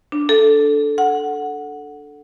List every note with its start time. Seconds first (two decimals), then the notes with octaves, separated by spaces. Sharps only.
0.12 D4
0.29 A4
0.98 F#5